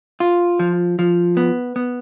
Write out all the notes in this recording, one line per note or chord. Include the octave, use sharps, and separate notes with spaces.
F4
F3
F3
B3
B3